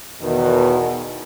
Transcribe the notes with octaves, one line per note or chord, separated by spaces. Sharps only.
E2 B2 D#3